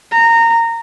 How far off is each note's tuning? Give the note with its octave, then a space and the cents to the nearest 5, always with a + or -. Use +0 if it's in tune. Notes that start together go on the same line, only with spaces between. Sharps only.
A#5 -20